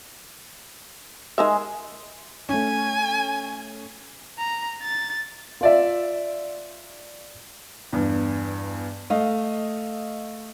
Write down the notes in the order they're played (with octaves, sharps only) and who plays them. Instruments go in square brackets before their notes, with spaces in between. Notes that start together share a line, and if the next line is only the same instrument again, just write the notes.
[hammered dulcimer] G#3 [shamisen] D#4 A#4 E5
[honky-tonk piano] A3 C#4 [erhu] G#5
[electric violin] A#5
A6
[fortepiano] F4 D5 E5
[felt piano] E2 G2
A3 D#5 F5